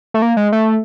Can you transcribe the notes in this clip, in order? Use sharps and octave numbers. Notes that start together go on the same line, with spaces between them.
A3
A#3
G#3
A3